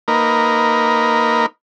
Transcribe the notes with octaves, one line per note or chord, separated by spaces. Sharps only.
A#3 D#4 A#4 B4